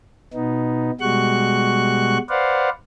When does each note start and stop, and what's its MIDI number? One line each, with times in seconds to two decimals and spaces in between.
0.34 0.91 47
0.34 0.91 59
0.34 0.91 63
1.01 2.18 47
1.01 2.18 55
1.01 2.18 56
1.01 2.18 66
1.01 2.18 85
1.01 2.18 90
2.29 2.69 71
2.29 2.69 72
2.29 2.69 74
2.29 2.69 77
2.29 2.69 78